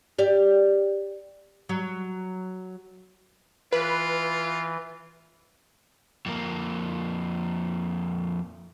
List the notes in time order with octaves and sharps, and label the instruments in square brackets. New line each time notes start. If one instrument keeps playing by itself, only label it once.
[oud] G4 D5
F#3
[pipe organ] E3 [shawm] F4 [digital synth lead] B4
[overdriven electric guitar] F2 A#3